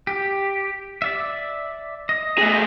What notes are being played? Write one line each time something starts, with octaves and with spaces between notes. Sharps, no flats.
G4
D5 E5
D#5
A3 G#4